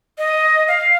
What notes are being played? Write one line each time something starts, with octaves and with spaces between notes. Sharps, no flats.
D#5
F5